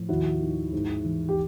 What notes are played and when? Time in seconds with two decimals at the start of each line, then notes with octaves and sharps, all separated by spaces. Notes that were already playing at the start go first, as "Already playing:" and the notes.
Already playing: A2 F3
0.09 D#2 E4 F#4
0.41 D#3
0.73 G#2
1.04 E3
1.29 G4